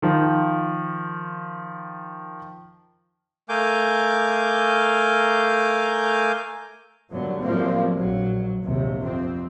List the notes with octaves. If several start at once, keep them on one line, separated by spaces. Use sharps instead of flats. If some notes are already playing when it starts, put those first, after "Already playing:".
D#3 F3
A3 A#4 F5 G#5 D6 G6
F#2 A#2 D3 F#3 G3 B3
F#2 A2 F3 G3 A#3 C4
A#1 F#3
A#1 D#2 C3
F2 C4